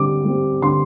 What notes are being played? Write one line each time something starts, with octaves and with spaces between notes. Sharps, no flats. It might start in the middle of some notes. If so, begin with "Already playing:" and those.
Already playing: D3 G3 C4 D6
G3 C4
D3 C6